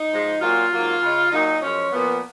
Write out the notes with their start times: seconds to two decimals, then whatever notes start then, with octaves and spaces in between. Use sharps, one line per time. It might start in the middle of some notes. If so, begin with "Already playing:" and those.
Already playing: D#4
0.10 G#2 F3 G#3
0.40 A#2 F#3 A#3 F4
0.71 G#2 F#3 A#3
1.02 C#3 G#3
1.32 A#2 F#3 A#3 D#4
1.62 F#2 F3 G#3 C#4
1.93 A#2 F3 A#3 B3